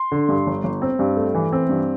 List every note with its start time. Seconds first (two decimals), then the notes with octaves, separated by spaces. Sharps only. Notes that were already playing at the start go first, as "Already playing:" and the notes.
Already playing: C6
0.12 D3
0.29 G2
0.47 G1
0.64 G1
0.82 C4
0.99 G2
1.17 A3
1.35 E3
1.53 C4
1.69 G2